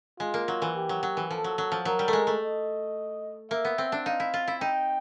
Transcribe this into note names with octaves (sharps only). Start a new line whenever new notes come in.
G#3 F4
A#3
F#3
E3
G4
F#3
F#3
E3
F3 A4
F#3
F#3
F3
F#3 A#4
G3
A3
G#3
A3
D#5
A#3 E5
B3
C4
D4
D#4 F5
E4
F4
E4
D#4 G5